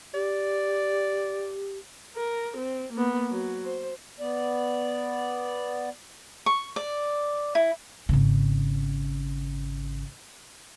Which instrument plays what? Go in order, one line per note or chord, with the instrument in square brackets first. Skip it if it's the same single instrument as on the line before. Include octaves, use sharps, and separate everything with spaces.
[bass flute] G4 [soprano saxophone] D5
[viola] A#4
C4
A#3 B3
F#3
C5
[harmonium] B3 D5
[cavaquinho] C#6
D5
E4
[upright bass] G#1 C#3